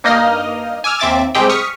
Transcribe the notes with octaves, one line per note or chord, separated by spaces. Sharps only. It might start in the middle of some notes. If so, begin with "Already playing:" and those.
G2 A#3 D#4 D#5 D#6 F6
G#5 D6 E6 F6
D#2 C4 E5 D6 A6
C2 G#3 C4 G4 G#4 G5
C#6 D#6 F6 B6 C#7